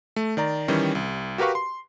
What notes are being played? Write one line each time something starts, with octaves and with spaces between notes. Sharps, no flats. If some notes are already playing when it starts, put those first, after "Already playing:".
A3
D#3 D5 A#5
D#3 E3 G3 C#4
C2
F#4 G4 A#4 B4 F5 C#6
C6